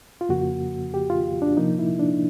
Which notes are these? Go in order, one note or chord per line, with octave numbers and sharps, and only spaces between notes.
F4
F2 C#3 F3 A#3 F#4
G4
F4
D4
C3 F3 A#3 D#4
E4
D4